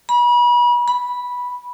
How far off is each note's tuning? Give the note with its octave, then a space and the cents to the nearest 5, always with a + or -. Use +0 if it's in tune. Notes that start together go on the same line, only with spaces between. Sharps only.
B5 -35
B5 -10